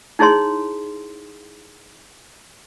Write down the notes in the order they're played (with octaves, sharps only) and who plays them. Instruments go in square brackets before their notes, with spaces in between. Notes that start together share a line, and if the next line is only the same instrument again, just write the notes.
[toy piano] D#4 E4 G#4 C#5 C6